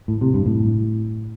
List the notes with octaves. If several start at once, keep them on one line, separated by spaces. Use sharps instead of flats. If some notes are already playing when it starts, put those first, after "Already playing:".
A2
C3
G2
A2